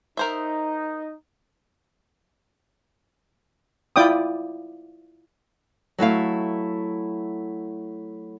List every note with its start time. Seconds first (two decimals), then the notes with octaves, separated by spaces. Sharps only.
0.17 D#4 A#4 C5 E5
3.96 E4 F4 D5 G5 D6 D#6
5.98 F#3 A3 E4 F5